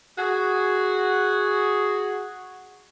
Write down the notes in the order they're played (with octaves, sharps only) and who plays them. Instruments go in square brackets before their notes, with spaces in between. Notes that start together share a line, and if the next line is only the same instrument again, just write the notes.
[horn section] F#4 G#4